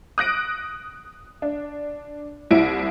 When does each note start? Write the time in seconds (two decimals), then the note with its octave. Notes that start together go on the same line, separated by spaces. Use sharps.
0.18 D#6 F#6 A#6 D7
1.42 D4
2.51 C2 E4 D7